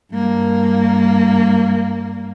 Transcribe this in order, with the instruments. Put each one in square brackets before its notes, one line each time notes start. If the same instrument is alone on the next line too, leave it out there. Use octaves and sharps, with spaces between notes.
[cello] G2 A#3